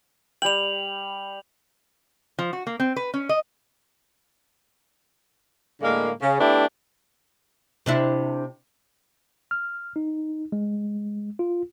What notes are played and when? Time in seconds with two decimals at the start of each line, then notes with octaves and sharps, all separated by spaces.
0.42 G3 G5 F7 F#7
2.39 F3
2.53 F#4
2.67 A#3
2.80 C4
2.96 B4
3.14 C#4
3.29 D#5
5.81 A2 D3 G#3 A#3
6.22 C#3
6.40 A3 B3 D4 E4 G4
7.86 C3 D4 E4
9.51 F6
9.96 D#4
10.52 G#3
11.39 F4